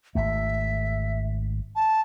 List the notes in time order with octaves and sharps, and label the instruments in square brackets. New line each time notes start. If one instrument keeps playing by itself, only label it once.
[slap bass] G#1 A3 [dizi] E5
[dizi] A5